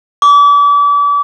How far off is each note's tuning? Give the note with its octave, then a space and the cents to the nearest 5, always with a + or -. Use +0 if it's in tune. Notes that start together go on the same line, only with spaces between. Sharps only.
D6 -35